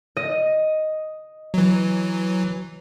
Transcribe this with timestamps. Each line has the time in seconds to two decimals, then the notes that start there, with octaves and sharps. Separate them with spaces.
0.17 D#5
1.54 E3 F#3